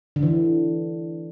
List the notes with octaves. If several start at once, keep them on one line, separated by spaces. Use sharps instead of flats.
D3
E3